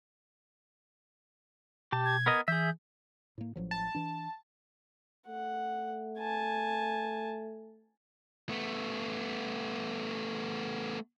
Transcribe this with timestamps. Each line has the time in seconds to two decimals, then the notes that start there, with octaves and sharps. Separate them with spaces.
1.92 B2 G4 A5
2.05 G#6
2.26 B3 A#4 D#5
2.48 E3 G#4 E5 G6
3.38 A2 A#3
3.56 A1 F3 F#3
3.71 A5
3.95 E3 D4
5.28 A3 F#5
6.19 G#5 A5
8.49 A3 B3